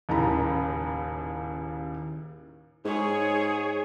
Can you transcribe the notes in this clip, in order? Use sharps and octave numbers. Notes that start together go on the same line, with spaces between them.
D#1 D#2 A2 C#3 A#5 B5
G#2 G#4 C#5